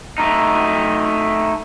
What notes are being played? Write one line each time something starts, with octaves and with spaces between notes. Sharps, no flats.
A3 D#4